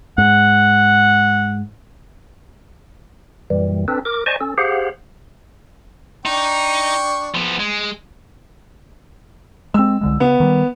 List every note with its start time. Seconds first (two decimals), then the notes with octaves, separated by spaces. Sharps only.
0.18 G#2 F#5
3.50 F#2 A#2 E3 G3
3.88 C4 D4 A4 B4
4.05 A#4 D6
4.26 C5 D5 D#5 G#5 A5 C#6
4.41 C#4 A4
4.58 G4 G#4 C5 F5 F#5
6.25 D4 D#4 G5 C#6
7.35 F3 B3
7.59 G#3
9.74 G#3 C4 E6
10.01 C2 D3 G#3
10.20 C#3 B3
10.40 D#3 G3